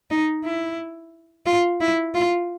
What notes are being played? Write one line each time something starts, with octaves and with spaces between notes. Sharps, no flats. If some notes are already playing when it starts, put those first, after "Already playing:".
D#4
E4
F4
E4
F4